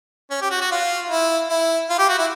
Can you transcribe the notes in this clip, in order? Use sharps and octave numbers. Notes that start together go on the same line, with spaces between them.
C#4
G4
F#4
F#4
F4
E4
E4
F4
G4
F#4
E4